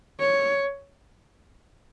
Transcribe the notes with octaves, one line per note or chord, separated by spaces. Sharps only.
C#5